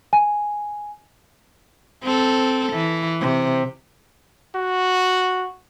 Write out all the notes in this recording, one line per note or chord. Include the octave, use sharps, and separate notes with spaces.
G#5
C4 A4
E3
C3
F#4